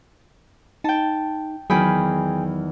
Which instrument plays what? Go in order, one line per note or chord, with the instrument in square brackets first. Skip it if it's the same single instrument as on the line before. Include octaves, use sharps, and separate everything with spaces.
[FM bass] D#4 [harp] G5 A5
[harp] E2 D#3 B5 [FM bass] F#3 [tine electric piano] G#4 G5 G#5